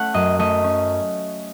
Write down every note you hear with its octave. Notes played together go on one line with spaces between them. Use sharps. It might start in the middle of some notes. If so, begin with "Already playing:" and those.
Already playing: A3 C#4 F#5
F#2 D#5
A3 D#5
C#4